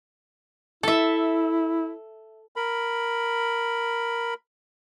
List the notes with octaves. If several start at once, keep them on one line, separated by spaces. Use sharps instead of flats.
E4 A4 E5
A#4 B5